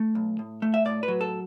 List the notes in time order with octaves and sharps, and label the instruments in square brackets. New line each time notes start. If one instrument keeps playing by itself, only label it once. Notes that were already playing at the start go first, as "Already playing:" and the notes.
Already playing: [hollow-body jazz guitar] A3
B1
A2
A3
E5
A2 D5
B4
F#3
A4